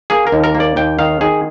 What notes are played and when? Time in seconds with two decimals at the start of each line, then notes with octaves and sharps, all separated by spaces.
0.10 A#3 G#4
0.27 A#4
0.32 D#2
0.44 A#4
0.55 A#3
0.60 D5
0.76 D#2 G5
0.99 D#3 F5
1.21 D#3 G#4